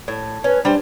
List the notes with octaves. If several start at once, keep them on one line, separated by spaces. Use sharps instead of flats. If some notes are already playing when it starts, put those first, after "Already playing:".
A2
C#4 B4
G3 D4 C5